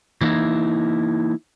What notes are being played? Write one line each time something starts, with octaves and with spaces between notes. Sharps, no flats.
E3 A#3 D#4 E4